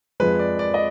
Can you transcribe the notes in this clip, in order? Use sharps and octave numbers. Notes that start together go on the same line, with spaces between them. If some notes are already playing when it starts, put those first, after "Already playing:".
F2 F3 G#3 B4
D5
D5
D#5